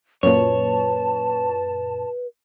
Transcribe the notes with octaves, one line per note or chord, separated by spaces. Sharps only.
F#2 A#2 B4 C#5 A5